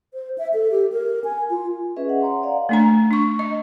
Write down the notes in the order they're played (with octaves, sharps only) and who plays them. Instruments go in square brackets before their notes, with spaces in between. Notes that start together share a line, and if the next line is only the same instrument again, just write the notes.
[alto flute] C5
E5
A4
G4
A#4
G#5
F4
[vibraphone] C#4 G#4 B4 D#5 E5
F#5
C#5 A#5 C6
D5 D#5 F5 F#5
[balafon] A3 D4 A#5
D4 C#6
D#5